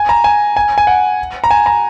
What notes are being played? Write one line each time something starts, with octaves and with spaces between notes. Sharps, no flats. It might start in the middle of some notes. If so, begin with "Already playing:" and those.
Already playing: G#5
A#5
G#5
G#5
G#5
F#5
A#5
G#5
A#5